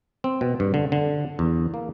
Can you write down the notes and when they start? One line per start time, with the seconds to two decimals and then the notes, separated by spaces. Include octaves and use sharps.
0.24 C4
0.41 B2
0.60 G2
0.74 D3
0.92 D3
1.39 E2
1.74 A#3